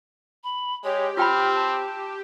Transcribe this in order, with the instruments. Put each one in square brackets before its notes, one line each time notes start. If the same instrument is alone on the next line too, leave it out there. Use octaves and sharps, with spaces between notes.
[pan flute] B5
[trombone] G#3 [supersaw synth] G4 [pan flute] C#5
[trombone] C4 [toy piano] F4 G5 B5 [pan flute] F6
[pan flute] A5